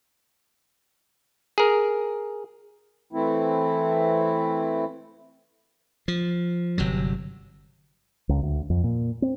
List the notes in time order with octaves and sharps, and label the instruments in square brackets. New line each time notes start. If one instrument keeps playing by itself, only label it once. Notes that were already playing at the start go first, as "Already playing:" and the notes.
[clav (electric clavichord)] G#4 A#4
[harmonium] E3 A3 C4 E4
[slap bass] F3
G1 C3 F#3
[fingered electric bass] C#2
D2
F2
A#2
C4